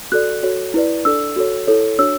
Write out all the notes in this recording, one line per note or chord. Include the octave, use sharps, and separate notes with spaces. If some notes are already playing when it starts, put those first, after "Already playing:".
F#4 A4 D5 F#6
F#4 A4 C#5
E4 B4 D5
D4 A4 D5 E6
F#4 A4 C#5
E4 A4 C#5
D4 F#4 C#5 E6